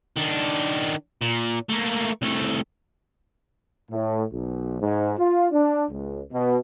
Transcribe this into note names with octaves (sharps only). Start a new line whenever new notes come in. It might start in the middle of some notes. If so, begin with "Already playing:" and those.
D#3 D4
A#2
A3 A#3
C2 A3
A2
B1
G#2
F4
D4
C#2
B2